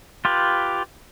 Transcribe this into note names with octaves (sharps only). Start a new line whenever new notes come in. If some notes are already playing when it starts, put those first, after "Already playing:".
F4 G4 B4